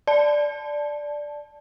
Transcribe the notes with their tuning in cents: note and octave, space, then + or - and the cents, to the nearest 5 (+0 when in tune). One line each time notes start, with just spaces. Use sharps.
D5 +0 A5 -10